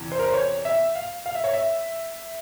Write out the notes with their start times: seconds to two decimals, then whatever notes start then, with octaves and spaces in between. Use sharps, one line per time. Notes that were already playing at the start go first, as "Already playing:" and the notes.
Already playing: E2 C3 E3
0.12 C5
0.19 A#4
0.26 C5
0.34 C#5
0.65 E5
0.96 F5
1.26 F5
1.35 E5
1.44 C#5
1.53 E5